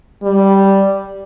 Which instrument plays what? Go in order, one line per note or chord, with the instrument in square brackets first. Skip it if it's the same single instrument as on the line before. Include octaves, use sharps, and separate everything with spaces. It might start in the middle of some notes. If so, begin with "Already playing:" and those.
[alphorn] G3